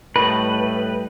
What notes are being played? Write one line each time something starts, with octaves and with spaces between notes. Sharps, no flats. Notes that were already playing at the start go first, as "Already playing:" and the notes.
A2 G3 A3 B4 D#5